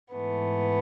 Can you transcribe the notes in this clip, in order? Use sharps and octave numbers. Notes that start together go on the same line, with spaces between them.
G#2 E3 A3 B3